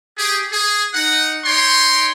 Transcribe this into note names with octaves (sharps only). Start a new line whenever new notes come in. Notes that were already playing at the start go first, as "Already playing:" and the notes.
G4 G#4
G#4
D#4 F#5
D#4 C#5 G5 C6